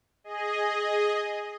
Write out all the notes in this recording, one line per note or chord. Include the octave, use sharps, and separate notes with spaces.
G#4 D#5